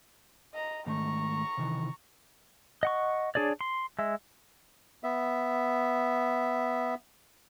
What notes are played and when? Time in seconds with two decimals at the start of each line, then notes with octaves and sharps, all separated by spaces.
0.54 D#5 A#5
0.86 G#2 D#3 A3 A#5 C#6
1.57 C3 D#3 E3
2.83 D#5 F#5 C#6
3.35 D4 G#4 C#5 D5
3.61 C6
3.99 G#3 E5
5.04 B3 E5